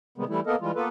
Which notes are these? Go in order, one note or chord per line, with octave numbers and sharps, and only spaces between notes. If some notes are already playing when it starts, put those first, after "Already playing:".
C3 D#3 G3 G#3 B3
E3 G3 A3 E4
A#3 B3 A4 A#4 D#5
E3 G3 G#3 F4
A#3 B3 F4 A4 B4